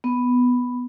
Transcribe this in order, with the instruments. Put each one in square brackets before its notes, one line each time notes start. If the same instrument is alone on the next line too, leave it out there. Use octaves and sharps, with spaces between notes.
[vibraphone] B3